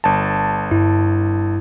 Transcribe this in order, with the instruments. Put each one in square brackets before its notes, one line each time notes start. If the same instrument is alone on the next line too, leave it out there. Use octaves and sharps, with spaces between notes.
[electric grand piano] G1 A5
[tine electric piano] G2 E4